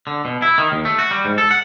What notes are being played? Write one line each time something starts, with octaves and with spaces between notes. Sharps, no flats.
D3
B2
E4
D#3
D#2
A3
F#4
G3
G#2
A4
F#5